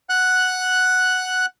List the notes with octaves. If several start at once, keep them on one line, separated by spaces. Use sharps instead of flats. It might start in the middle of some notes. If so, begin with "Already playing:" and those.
F#5 F#6